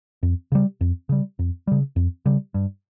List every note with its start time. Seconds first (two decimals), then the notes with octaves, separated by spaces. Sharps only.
0.23 F2
0.52 C#3 G3
0.81 F2
1.09 C#3 G3
1.39 F2
1.67 C#3 G3
1.96 F2
2.26 C#3 G3
2.54 G2